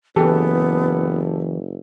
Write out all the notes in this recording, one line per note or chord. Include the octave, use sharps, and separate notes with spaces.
F#1 E3 B3 G4 A4